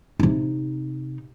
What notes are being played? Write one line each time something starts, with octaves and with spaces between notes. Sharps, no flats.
C3 D#4